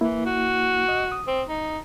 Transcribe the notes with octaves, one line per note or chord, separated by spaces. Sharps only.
E3 A#3 E4
F#4
D#5
D#6
C4
D#4